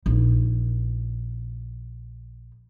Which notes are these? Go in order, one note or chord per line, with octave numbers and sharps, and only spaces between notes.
A#1 D#4